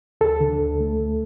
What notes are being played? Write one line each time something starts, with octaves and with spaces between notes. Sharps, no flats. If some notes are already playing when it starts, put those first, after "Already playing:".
D2 A4
D3
D2
A3
D2